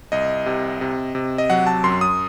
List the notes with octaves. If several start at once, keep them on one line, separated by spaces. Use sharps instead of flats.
C2 D#5
C3
C3
C3
D#5
F#3 F#5
A5
F#2 C6
D#6